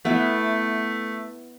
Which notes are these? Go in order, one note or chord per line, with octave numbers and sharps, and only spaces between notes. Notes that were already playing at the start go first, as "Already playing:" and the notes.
A3 B3 E4